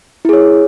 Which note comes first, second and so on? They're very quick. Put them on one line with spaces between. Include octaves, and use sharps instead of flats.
E4 G#4 C#5